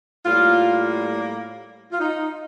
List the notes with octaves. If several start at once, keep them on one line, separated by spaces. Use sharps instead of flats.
A2 G3 A#3 F4
F4
D#4